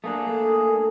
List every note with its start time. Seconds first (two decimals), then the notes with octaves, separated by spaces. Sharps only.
0.04 A3 A#3 D4 G#4
0.28 A4